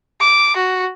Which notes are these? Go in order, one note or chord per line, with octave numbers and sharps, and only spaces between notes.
D6
F#4